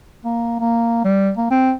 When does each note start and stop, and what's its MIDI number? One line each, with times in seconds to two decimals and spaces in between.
0.25 0.58 58
0.60 1.03 58
1.04 1.31 55
1.37 1.48 58
1.51 1.73 60